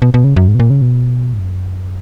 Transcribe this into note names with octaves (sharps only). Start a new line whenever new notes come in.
B2
B2
C#3
F#2
G#2
B2
A#2
C#3
B2
G#2
F#2